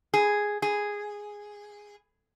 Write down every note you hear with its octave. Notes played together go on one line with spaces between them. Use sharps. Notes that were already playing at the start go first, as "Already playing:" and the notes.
G#4
G#4